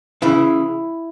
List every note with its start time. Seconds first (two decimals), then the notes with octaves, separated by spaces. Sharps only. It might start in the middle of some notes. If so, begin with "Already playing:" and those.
0.22 C#3 E3 E4